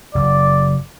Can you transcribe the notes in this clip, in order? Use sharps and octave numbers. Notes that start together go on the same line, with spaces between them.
F#1 D5